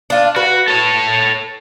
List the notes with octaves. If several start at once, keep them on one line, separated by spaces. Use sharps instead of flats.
D4 F4
F#4 B4
A4 C#5